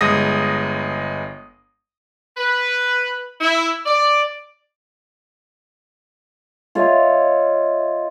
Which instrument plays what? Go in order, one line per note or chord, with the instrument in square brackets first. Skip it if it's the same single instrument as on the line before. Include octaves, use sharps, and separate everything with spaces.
[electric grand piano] G1 G#3 D#6 A#6
[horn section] B4
E4
D5
[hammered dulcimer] F4 C#5 D#5 E5